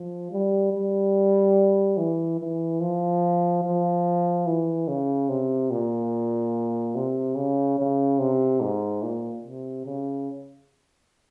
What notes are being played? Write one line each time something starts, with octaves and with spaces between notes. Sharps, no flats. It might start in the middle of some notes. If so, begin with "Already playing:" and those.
Already playing: F3
G3
G3
E3
E3
F3
F3
E3
C#3
C3
A#2
C3
C#3
C#3
C3
G#2
A#2
C3
C#3